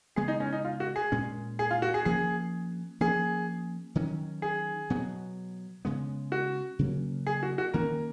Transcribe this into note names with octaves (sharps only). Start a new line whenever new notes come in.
C#3 G#3 B3 G#4
D#4
C#4
D#4
F4
F#4
G#4
A#2 G#3 C#4
G#4
F4
F#4
G#4
F3 A#3 C#4 G#4
F3 A#3 C#4 G#4
D#3 F#3 C#4
G#4
B2 F#3 B3
C#3 G#3 B3
F#4
C#3 F#3 A#3 C#4
G#4
F#4
F#4
D#3 A#3 C#4 A#4